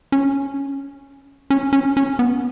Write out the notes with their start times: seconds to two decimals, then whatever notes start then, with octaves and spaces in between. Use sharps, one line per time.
0.12 C#4
1.50 C#4
1.73 C#4
1.97 C#4
2.19 B3